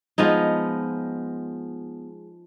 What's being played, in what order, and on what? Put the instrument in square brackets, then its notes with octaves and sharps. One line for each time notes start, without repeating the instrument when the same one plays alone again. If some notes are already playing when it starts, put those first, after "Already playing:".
[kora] F3 G#3 B3 D#4